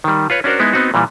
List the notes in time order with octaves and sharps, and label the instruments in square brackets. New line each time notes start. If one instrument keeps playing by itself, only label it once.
[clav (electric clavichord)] D#3 G3
F4 B4 C#5
C#4 D4 F#4 A#4 C5
G#3 B3 D#4 E4
B3 C4 D#4 F#4
A#2 E3 G3